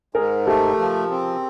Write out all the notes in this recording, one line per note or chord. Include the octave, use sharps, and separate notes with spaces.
G#2 G#4 A#4
A3 G4 A4
F3
C4